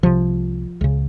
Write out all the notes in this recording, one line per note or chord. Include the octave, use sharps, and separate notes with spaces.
C2 C3 F3
C#2 C#3